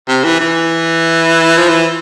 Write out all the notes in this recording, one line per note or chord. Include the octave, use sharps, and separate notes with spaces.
C3
E3
E3
F3
E3